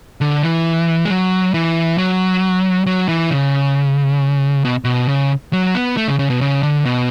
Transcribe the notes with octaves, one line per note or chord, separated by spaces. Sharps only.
D3
E3
G#3
F#3
E3
F#3
F#3
E3
C#3
B2
B2
C#3
F#3
B3
A3
C#3
C#3
B2
C#3
D3
B2